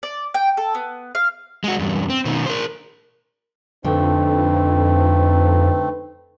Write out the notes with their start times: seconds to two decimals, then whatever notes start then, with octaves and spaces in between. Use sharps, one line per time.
0.03 D5
0.34 G5
0.57 A4
0.75 B3
1.15 F5
1.64 G#3 F#4
1.79 E2 G2
2.10 C4
2.25 B2 D#3
2.46 A#4 C5
3.84 F2 D3 A3 C4 D#4 B4